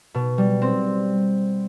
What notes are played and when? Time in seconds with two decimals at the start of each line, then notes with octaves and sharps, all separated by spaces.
0.14 B2
0.38 G3
0.62 C4